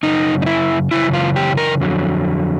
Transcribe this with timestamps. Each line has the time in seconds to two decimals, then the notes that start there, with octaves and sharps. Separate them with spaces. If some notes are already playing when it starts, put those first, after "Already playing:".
0.03 F#2 C#3 D#4
0.42 D#4
0.46 E4
0.91 F#2 C#3 E3 E4
1.14 F4
1.36 G4
1.57 A#4
1.80 F2 D3 F#3